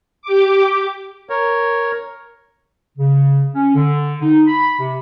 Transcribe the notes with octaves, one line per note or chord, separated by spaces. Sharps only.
G4 D6
A#4 C#5
C#3
C#4
D3
D#4
B5
C3